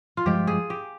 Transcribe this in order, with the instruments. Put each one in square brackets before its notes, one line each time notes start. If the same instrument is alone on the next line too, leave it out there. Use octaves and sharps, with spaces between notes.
[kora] F4
[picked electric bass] G2 F3 G#3 [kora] G4
[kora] G#4
G4